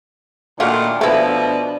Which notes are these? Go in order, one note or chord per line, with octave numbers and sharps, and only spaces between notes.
A#2 D#3 A3 D4 F4 F#4
B2 F3 A3 E4